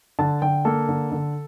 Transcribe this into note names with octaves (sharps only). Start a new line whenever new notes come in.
D3 A5
D3 G5
A#3 A4
D3
D3